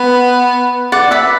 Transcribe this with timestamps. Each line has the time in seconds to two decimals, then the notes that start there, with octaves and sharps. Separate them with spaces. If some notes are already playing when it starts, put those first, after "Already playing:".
Already playing: B3 B4
0.92 D5 F#5
1.11 B4 E5